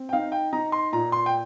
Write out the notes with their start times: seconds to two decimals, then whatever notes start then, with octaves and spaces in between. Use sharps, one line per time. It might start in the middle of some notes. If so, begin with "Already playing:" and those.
Already playing: C4
0.09 G5
0.13 D#4 F5
0.32 G5
0.53 D#4 A#5
0.72 C6
0.92 A#2 A#5
1.12 C6
1.26 G5